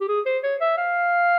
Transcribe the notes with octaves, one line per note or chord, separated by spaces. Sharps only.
G4
G#4
C5
C#5
E5
F5